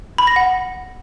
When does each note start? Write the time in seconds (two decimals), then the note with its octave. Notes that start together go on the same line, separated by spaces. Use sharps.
0.18 B5
0.27 A#6
0.36 F#5